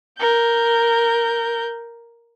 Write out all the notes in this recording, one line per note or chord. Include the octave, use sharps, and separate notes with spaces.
A#4 G6